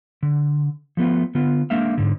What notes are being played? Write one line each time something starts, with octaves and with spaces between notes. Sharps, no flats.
D3
F3 A3 B3 F4
D3 B3 F4
G#3 A#3 D4 E5 F5
G#2 D3